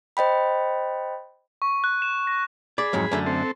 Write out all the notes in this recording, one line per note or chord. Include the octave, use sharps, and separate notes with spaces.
C5 D#5 G5 B5
C#6
F#6
E7
A#6
G#4 D5 B5
F2 G#2 F#3
F#2 D3 A3
C4 A4